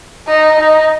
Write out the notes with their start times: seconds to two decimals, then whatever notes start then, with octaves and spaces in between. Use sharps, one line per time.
0.28 D#4
0.58 D#4